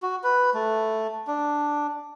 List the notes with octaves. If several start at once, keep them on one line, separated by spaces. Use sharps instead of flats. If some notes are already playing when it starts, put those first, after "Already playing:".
F#4
B4
A3
D4